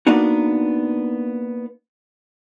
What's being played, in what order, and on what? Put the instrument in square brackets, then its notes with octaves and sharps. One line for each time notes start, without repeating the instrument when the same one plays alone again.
[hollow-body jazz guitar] A#3 B3 D4 D#4 F#4